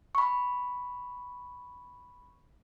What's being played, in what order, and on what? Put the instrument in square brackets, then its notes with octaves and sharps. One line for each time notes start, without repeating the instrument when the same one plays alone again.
[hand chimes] B5 C#6